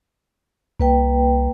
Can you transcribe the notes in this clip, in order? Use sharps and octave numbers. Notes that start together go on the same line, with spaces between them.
C2 A#3 B4 G5